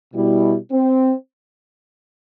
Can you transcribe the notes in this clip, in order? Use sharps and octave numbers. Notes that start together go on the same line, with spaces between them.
B2 G3 E4
C4